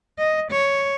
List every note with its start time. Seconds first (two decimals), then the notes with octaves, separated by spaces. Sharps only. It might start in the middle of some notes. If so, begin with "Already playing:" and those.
0.18 D#5
0.51 C#5